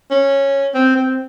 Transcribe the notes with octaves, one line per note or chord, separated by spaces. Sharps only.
C#4
C4
C4